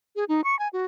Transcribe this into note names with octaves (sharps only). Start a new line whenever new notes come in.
G#4
D#4
C#6
G#5
F#4